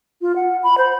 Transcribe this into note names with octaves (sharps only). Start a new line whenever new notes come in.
F4
F#5
B5
C5